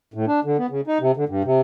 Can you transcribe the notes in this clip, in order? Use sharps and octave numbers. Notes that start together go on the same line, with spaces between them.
A2
D4
D3
B3
C#3
D#4
C3
D3
G2
C3